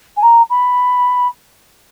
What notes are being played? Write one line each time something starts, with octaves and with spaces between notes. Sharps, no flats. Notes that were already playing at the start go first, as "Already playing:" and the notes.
G#5
A#5
B5